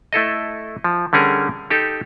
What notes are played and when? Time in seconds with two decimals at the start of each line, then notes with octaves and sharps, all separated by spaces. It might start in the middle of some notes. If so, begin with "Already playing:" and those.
0.13 A3 E4 A4 D#5
0.84 F3
1.13 D3 G3 C#4 G#4 A#4
1.70 D#4 G4 A4